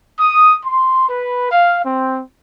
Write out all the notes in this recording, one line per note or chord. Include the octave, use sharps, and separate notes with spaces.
D#6
C6
B4
F5
C4